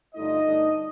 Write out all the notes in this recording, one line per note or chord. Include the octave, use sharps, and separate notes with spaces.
G2 D3 A3 D4 D#4 F4 D#5
G2 D3 A3 D4